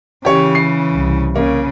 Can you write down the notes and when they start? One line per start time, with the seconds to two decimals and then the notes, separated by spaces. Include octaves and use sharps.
0.25 C#3 E3 G4 C#5
0.55 C7
0.91 C2
1.36 C#3 A#3